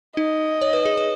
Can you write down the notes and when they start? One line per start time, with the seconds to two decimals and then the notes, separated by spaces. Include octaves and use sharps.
0.17 D#4 D#5
0.61 C#5
0.73 B4
0.85 G#4
0.97 B4